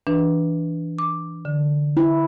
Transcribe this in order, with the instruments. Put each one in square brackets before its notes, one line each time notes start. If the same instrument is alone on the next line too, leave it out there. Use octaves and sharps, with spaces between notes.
[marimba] E3 D4 B4
D6
D3
[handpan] E4